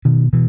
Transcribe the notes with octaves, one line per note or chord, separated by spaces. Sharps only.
B2 D#3
B2 E3